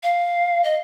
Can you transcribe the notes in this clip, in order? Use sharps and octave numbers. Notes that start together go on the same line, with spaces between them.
F5
D#5